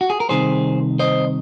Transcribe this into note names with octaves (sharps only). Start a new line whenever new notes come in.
F#4
G#4
A#4
C2 C3 D#3 G#4 C5
C5 D#5